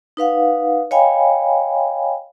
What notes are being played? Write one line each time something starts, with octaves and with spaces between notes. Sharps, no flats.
D#4 B4 F5 F#5
C#5 D#5 F5 G5 G#5 B5